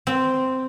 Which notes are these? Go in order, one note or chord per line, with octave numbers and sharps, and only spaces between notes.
C4